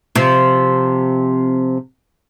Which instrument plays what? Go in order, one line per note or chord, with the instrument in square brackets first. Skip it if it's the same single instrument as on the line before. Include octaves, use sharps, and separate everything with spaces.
[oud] C3 F3